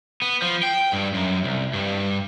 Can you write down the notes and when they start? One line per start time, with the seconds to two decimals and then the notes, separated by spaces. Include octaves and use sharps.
0.22 B3
0.42 F3
0.63 G5
0.93 G2
1.14 F#2
1.44 C2
1.73 G2